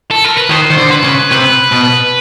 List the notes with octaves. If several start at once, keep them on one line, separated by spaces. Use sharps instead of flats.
A4
A#4
B4
D#3 C5
D#3
D3
B4
C#3
C3 B4
B2